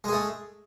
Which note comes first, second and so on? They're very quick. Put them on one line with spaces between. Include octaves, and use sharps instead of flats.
G#3 G#4 A3